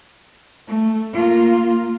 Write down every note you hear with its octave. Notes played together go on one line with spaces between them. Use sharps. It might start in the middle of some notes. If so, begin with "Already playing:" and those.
A3
A#3 F4